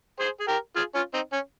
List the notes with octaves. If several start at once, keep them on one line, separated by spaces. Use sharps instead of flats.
G#4 C5
G#4
G4 A#4
F4 G#4
C#4 F4
C4 D#4
C#4